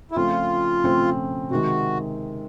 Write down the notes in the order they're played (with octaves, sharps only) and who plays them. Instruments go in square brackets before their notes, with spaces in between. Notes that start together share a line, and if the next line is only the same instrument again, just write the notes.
[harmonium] E4
[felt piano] C#3 F3 A3 C4 [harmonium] F4
[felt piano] C#3 F3 A3 C4
[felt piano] C3 D#3 G#3 [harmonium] F#4